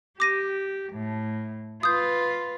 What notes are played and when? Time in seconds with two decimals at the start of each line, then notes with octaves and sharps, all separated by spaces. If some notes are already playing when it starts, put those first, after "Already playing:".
0.20 G4 D6 A#6 D#7
0.93 A2
1.83 F4 B4 D#6 G6